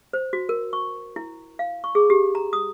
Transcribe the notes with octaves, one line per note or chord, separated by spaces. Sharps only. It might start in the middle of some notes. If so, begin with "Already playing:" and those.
C5
F#4
A#4
C#6
E4
F5
C#6
G#4
G4
A#5
D#6